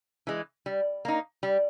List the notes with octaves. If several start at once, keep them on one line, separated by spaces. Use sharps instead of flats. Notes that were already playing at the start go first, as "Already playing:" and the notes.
E3 G#3
G3
A#3 D#4
G3